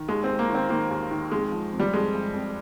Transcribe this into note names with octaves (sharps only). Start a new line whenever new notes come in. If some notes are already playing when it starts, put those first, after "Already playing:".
Already playing: D#3
D#2 G#3
C4
D#2
A#3
D#3
C4
D#3 A#3
D#2
D#3
F2 G#3
F3
F2
G3
F2 G#3
F2
F2